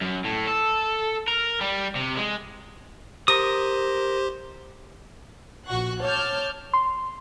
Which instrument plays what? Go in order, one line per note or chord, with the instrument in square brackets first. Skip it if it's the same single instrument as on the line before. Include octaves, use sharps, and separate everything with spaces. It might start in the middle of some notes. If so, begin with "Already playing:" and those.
[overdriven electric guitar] F#2
A2
A4
A#4
G3
C3
G#3
[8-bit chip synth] G4 C5 C6 [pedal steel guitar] A#4 D#6
[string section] A#1 F#4 F#5 C#6 F#6
C#5 A5 D6 F6 G6
[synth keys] C6